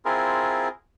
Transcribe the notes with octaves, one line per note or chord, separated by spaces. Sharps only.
C4 E4 F4 G#4 A#4